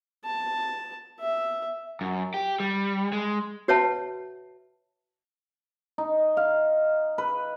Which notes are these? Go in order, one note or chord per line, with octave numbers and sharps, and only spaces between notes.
A5
E5
F#2
G4
G3
G#3
F#4 B4 C#5 E5 F#5 A5
D#4
F5
B4